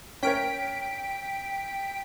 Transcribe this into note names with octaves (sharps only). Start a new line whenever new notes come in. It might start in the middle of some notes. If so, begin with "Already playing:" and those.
C#4 A#4 C#5 G5 B6 D7